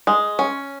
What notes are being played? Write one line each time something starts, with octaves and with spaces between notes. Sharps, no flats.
G#3
C#4